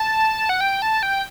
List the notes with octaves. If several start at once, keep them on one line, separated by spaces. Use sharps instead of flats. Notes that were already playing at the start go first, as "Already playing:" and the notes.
Already playing: A5
F#5
G5
A5
G5